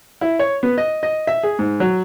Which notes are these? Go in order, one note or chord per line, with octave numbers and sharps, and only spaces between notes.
E4
C#5
B3
D#5
D#5
E5
G#4
G#2
F#3